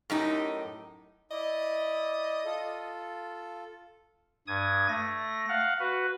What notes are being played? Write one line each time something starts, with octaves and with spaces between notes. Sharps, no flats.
F#2 A2 D#4 G4
E4 D5 D#5
F4 A4
G2 D#6 G#6
A3 A#6
F5 F#5
F#4 B4